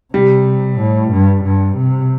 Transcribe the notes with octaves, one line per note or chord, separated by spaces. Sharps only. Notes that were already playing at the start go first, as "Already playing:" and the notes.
C3 G3
A2
G2
G2
C3